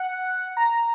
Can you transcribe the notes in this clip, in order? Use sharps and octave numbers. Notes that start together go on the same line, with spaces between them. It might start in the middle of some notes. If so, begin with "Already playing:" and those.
Already playing: F#5
A#5